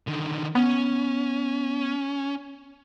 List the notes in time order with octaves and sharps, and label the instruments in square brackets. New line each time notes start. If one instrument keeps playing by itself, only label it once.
[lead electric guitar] D3 D#3
[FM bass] B3 [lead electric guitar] C#4